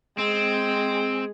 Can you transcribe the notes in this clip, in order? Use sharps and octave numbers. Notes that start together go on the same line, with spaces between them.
G#3 C4